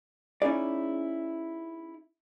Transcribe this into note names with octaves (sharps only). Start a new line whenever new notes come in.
C#4 D#4 E4 G#4 D5